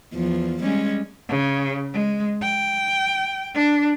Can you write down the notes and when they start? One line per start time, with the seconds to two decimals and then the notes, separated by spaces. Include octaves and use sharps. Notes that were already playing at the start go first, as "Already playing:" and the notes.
0.13 E2 F3
0.63 G3 G#3 C#4
1.29 C#3
1.93 G#3
2.42 G5
3.55 D4